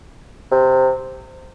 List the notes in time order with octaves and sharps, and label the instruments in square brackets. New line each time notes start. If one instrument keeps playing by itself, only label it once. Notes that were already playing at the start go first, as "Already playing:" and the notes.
[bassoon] C3